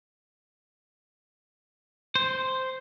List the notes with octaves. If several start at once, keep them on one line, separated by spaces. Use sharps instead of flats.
C5